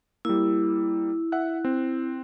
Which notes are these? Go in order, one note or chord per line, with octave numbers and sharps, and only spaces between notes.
G3 A#3 E4
E5 F#5 F#6
C4